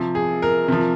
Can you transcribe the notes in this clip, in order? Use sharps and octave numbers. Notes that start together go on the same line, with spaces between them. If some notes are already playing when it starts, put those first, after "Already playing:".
Already playing: C3 F3
G#4
A#4
C3 F3